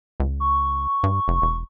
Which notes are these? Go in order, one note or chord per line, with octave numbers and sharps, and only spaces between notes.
C#2
C#6
G2
F1
E1